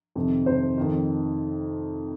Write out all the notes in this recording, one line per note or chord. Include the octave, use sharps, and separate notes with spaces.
F2 C3 D#3
F2 C3 D#3 C5
F2 D#3